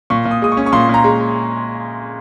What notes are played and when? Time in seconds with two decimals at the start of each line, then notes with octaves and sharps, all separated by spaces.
0.10 A#2 C#6
0.25 A#2
0.31 D#6
0.42 G#3 D#6
0.52 C#6
0.57 C#4
0.66 C#6
0.73 A#2 C6
0.89 A#2 A#5
1.04 G#3